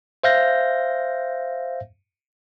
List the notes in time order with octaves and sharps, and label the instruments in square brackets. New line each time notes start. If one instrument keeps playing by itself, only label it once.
[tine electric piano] C5 E5 F5 G6 A#6